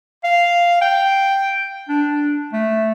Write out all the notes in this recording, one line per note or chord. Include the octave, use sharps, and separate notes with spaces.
F5
G5
D4
A3